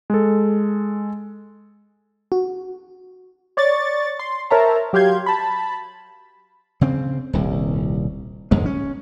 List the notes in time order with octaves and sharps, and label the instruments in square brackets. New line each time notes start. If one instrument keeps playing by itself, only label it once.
[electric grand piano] G#3 A4
[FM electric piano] F#4
[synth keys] C#5 D5 C#6 A6
C6
A#4 C5 C#5 E5 A5 A#5
F#3 G4 F5 C6 G6 G#6
A5 B5
[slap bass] C#3 C4
D#1 C2
G1 F2 G#2 G#3
C#4